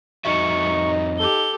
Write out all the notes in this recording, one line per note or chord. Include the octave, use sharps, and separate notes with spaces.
F2 D#4 F#4 E5 C#6
G4 A4 G7